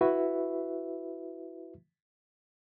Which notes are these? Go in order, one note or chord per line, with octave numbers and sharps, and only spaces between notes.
E4 F#4 B4 E5